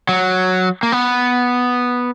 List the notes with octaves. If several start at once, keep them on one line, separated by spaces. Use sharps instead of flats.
F#3
A#3
B3